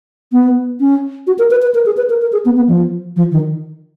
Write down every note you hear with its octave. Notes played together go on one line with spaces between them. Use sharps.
B3
C#4
F#4
A#4
B4
B4
A#4
G#4
B4
A#4
A#4
G#4
B3
B3
F3
F3
D#3